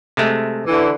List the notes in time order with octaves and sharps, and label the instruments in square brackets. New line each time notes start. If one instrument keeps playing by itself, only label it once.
[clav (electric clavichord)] C3 G#3 A3
[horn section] D3 E3